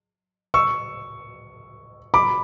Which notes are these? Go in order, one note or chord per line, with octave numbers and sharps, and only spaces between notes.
C#6 E6
B5 D6